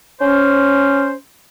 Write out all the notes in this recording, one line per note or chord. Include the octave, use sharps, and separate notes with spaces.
C#4 C5